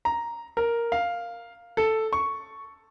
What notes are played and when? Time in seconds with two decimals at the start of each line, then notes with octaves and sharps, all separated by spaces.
0.05 A#5
0.57 A#4
0.92 F5
1.77 A4
2.13 C#6